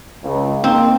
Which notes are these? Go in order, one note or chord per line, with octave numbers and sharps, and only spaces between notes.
C#2
A#3 C4 D#4